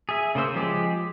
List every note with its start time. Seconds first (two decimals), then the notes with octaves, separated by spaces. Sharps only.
0.09 G#4 E5
0.35 C#3 A#3 C5 E6
0.55 F3 G#3 G4 G#4